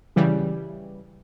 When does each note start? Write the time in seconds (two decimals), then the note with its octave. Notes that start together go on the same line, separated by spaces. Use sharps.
0.16 C#3 E3 G3